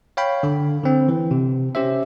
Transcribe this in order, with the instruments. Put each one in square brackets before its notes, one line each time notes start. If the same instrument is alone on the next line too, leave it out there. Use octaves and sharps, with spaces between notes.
[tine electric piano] C#5 F5 G5 B5
D3
D3 C4
E3
C3
C#4 G4 C5 E5